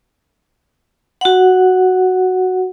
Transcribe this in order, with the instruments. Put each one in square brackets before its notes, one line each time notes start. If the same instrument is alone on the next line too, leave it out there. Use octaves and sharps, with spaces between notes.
[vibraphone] F#4 F#5